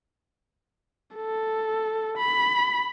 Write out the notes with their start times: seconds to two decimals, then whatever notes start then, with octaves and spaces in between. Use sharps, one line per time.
1.16 A4
2.18 B5